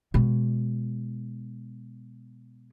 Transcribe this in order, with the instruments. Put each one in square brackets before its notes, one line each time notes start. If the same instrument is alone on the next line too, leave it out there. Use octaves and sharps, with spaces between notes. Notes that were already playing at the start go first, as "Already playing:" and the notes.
[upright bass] B2 G#3